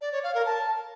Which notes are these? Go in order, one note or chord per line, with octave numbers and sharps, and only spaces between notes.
D5
C#5
F5
A#4
A5